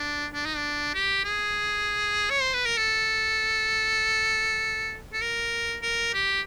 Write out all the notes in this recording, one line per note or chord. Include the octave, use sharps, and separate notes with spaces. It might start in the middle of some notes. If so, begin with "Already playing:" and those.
Already playing: D4
D4
D#4
D4
G4
G#4
C#5
C5
B4
A#4
A4
A4
A#4
A#4
G4